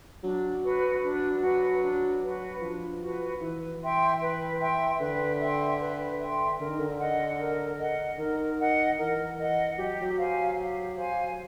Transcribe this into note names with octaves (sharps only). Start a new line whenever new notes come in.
F#3 D4
F#4 B4
D4
F#4 B4
D4
F#4 B4
F3 D4
F#4 B4
E3 B4
E5 G5 C6
B4
E5 G5 C6
D3 B4
E5 G5 C6
B4
E5 G5 C6
D3 A#4
D#3
D3
D#5 F#5
A#4
D#5 F#5
D#3 A#4
D#5 F#5
E3 A#4
D#5 F#5
F#3 G4
F#3
C5 F5 G#5
G4
C5 F5 G#5